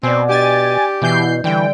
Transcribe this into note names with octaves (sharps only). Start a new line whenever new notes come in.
B2 C4 D5 G#5
D4 G4 G#5 A6
B2 E3 G6 C7
D3 E3 G3 G5